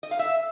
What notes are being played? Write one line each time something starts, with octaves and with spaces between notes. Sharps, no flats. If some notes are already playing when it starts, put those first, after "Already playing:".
D#5
F5
E5